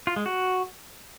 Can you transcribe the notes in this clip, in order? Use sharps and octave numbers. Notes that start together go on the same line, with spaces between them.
F4
G#3
F#4